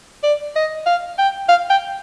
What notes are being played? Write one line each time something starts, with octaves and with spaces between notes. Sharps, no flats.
D5
D#5
F5
G5
F5
G5